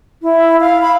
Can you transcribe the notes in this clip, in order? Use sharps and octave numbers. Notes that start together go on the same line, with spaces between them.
E4
F5
B5